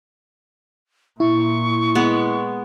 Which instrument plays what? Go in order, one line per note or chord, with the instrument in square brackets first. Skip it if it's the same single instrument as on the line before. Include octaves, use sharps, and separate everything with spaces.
[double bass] A#2 [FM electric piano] E4 [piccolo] C#6
[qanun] G#3 B3